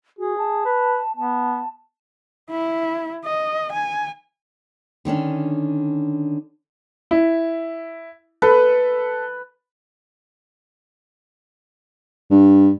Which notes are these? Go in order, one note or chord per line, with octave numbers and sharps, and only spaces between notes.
F#4 G#4
A5
B4
B3 A5
E4
D#5
G#5
D3 D#3 C#4 D4
E4
A4 B4
G2